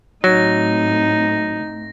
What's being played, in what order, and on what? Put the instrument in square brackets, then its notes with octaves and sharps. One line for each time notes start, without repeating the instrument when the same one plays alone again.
[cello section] A2 A3 C4 [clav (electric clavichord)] F#3 [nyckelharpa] D#4 [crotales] A#6